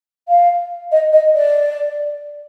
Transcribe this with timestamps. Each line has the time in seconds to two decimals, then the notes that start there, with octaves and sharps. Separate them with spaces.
0.29 F5
0.92 D#5
1.13 D#5
1.35 D5